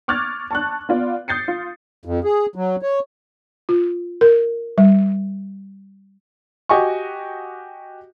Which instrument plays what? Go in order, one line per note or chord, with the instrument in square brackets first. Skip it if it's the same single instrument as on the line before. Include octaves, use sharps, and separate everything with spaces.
[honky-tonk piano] C#6 D6 F6 F#6 G#6 A6
A5 C#6 F#6
B3 F4 D5
D#6 G6 A6 C7 C#7
F4
[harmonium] F2
G#4
F#3
C#5
[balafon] F4
A#4
G3
[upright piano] F#4 G4 D#5 G#5 C#6